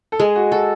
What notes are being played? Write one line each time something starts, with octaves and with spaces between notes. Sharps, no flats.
A4
G#3 G#4
F#4
F#4 A4